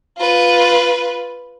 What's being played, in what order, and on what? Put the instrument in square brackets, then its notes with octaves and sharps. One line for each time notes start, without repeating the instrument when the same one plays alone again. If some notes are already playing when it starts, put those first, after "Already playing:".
[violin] F4 B4